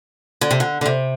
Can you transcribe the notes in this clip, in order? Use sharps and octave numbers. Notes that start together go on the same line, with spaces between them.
D3
C3
D3
D3
C3